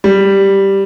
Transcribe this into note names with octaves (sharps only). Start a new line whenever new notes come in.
G3